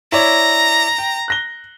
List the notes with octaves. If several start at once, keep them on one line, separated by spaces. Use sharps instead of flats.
E4 C#5 D5 A#5
G5
F#6 A#6 G7